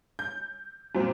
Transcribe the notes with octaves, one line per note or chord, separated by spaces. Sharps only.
G6
F#2 A#2 C4